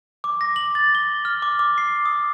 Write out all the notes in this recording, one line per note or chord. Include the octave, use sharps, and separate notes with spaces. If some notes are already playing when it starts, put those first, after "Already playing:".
D6
A#6
F#7
A6
G7
F6
D6
D6
C7
D#6